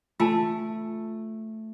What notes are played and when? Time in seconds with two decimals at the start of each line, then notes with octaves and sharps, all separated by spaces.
0.20 A3 F4 G#5 A5